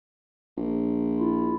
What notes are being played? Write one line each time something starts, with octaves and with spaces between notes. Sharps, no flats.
A#1
E4 F4